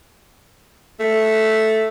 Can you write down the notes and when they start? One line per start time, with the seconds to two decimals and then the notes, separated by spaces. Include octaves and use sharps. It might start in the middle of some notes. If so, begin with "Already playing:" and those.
1.00 A3